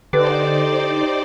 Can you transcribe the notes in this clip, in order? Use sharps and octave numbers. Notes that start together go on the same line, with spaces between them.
D3 D#4 G4 B4 C5 D5 D6